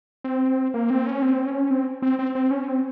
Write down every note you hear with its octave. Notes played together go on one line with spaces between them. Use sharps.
C4
A#3
C4
C#4
C4
C#4
C4
C4
C4
C4
C#4
C4